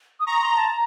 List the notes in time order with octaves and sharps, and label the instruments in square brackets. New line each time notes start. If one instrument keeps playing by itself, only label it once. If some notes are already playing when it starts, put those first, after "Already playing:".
[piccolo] D#6
[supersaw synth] A#5 [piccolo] C#6
[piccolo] C6
A5
A#5